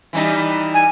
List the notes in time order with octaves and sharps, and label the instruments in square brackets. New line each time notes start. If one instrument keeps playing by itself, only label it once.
[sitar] E3 G3 D#4
[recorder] G#5